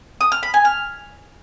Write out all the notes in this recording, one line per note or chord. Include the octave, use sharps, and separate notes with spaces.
D#6
F6
B5
G#5
F6